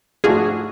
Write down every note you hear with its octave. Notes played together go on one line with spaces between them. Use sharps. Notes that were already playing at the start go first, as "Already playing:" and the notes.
G#2 F3 A3 D4 F4 F#4 G#4